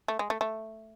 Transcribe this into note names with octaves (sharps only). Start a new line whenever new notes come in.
A3
G#3
A3
A3